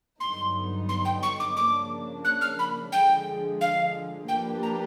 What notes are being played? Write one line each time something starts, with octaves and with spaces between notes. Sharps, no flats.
G2 D3 F#3 B3 D#4 C6
C6
G5
C#6
D6
C#3 F3 A#3 D4 D6
F#6
F6
B5
D3 F3 G#3 G5
F5
F3 A#3 D4 G4 B4 G5
A#5